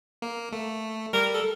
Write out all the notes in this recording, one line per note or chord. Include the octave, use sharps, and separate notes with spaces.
A#3
A3
G3 A#4
A4